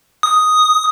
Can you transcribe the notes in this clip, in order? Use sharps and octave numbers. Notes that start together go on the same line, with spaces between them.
D#6